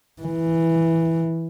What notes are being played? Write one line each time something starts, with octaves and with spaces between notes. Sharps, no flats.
E3